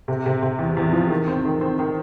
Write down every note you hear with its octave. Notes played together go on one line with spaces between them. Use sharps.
C3
C3
C3
E2
E2
F3
D#3
C4
D#3
C4
D#3